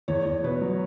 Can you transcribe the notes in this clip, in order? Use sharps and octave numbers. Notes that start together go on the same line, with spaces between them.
E2 C#5
E2
B2 B4
F#3